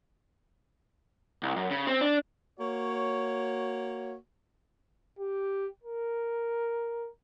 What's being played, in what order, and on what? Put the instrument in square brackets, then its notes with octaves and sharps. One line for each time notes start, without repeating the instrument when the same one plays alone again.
[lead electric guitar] C2
F#2
C#3
C4
D4
[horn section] A#3 F#4 C#5
[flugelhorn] G4
A#4